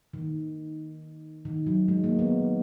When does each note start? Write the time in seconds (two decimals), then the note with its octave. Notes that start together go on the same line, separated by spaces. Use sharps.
0.13 D#3
1.45 D#3
1.67 F#3
1.88 G#3
2.04 A#3
2.19 B3